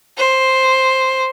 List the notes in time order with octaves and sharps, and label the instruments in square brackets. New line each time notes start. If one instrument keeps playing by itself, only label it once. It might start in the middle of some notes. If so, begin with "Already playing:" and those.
[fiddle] C5